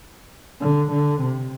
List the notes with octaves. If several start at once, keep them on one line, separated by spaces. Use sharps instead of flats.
D3
D3
C3